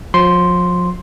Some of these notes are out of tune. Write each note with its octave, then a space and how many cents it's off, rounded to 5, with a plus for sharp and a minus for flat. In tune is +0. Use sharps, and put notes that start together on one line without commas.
F3 +35 C6 +0